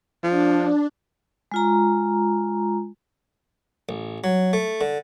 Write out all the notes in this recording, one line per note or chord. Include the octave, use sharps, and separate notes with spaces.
F3 D4
G#3 F4 A#5
A1
F#3
A3
D3